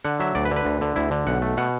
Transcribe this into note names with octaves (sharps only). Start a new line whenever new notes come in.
D3 F#5
F#3 E5
D2 D5
B4
D3
B4
D2
D3
D2 E4
D3
B1 F#5
A3
B2 F#5